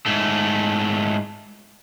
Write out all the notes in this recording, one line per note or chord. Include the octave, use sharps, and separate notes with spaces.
G#2 A3